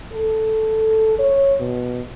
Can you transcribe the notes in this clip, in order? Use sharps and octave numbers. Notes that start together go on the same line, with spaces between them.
A4
C#5
B2